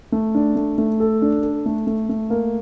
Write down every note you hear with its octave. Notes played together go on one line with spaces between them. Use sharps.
A3
D4
A3
A3
A4
D4
A4
A3
A3
A3
A#3